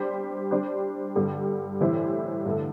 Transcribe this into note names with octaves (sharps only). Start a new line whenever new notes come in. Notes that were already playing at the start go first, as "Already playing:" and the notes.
Already playing: G3 D4 G4 C5
G3 D4 G4 C5
G2 D3 G3
A2 E3 G3 E4 C5
G2 D3 A3